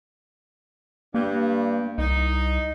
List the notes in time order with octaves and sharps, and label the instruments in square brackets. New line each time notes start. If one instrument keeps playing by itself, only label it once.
[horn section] G2 [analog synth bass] A#3
[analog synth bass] C2 [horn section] D#4